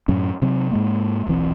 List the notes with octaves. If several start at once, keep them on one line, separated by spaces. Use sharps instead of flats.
F#2 A2 F#3 C#4
C3 F#3 C4
G#2 G#3 A#3
D#1 B1 E3 C4